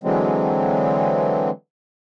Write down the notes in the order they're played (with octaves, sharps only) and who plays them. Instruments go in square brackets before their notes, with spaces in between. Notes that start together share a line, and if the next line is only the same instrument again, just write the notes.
[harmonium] D3 E3 F#3 G#3 C4